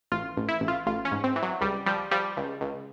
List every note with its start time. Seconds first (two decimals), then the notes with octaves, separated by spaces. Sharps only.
0.12 A1 F4
0.37 A1
0.48 E4
0.61 A1
0.68 F4
0.87 A1 F4
1.05 C#4
1.11 G#2
1.24 C4
1.36 E3
1.43 F#3
1.61 C#2 G3
1.86 F3 G3
2.11 F3 G3
2.37 C#2
2.61 C#2